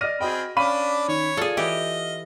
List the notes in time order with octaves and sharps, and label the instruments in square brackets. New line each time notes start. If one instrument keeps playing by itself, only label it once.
[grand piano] D5 D#5 [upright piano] F6 A#6 D#7
[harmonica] C4 G#4 B5 [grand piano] F#4 D#5 G5
[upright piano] C#4 B5 D#7 [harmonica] D4 D5 [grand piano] F5
[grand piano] D#3 [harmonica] C#5
[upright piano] F4 [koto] G#4 A4 [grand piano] D5
[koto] E3 G4 [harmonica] D#5